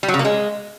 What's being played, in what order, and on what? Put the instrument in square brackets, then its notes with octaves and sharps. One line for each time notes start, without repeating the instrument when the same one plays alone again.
[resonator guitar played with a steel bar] G3
F#3
C#3
A#3
G#3